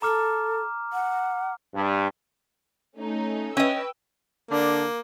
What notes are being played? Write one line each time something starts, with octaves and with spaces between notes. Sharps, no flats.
A4 A#5 D6 F6
F#5
G2
A3 C#4 D#4
C#4 B4 D#5 G5 E6
D3 A#3 D4